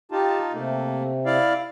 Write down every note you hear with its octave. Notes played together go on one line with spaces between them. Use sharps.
D#4 F4 G4 A5
C3 A3 A#3
E4 D5 F5